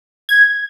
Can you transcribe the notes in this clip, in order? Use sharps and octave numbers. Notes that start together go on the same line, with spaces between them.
G#6